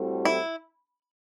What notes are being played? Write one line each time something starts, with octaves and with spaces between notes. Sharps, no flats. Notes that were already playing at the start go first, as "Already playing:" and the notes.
Already playing: A2 G3 C4 F#4 A4
E4